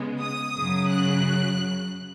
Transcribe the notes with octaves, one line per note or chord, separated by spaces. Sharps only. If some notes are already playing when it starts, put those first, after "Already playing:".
Already playing: C#3 G#3 B3
D#6
F#2 C#3 F#3
F#6